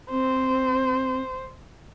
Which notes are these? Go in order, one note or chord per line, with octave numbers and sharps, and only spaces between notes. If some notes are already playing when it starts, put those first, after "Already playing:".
C4 C5